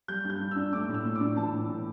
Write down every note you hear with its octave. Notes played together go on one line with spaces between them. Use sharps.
G3 G6
G2
G6
G2
E6
D4
A3 D6
A2
E6
A2
D6
D4
E3 A5
A2
A2